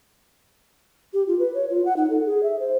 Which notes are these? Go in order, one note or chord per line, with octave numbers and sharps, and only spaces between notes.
G4
F4
B4
C#5
F4
F#5
D#4
A4
G#4
E5
C5